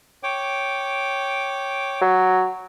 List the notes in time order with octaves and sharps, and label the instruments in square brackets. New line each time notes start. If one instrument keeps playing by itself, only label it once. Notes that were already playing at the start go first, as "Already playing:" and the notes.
[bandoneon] C#5 G5 D6
[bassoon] F#3